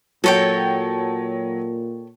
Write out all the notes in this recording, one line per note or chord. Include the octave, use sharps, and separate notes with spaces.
A#2 F#3 A4 C#5 G5